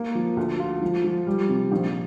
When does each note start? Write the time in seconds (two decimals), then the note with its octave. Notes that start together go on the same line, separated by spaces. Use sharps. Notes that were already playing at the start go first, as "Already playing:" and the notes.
Already playing: A#3
0.15 F3
0.37 D2
0.60 F4
0.82 F3
1.04 F3
1.27 G3
1.49 C3
1.72 A#1